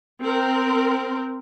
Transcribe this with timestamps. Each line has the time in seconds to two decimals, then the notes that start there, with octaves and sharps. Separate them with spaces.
0.20 C4 A#4